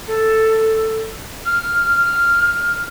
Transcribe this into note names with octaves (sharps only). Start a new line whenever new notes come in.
A4
F6